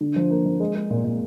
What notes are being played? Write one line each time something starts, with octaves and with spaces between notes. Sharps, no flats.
D3
F3
A#3
F3
G#3
G#3
A#2
A#2